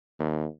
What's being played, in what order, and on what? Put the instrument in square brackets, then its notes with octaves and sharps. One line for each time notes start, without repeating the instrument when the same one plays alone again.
[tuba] D#2